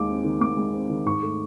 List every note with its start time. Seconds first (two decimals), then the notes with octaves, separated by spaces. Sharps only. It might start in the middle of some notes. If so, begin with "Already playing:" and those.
Already playing: D#2 G#3 D6
0.09 C4
0.24 D#3
0.40 D#2 D6
0.57 G#3
0.73 C4
0.90 D#3
1.06 G#2 C#6
1.22 A3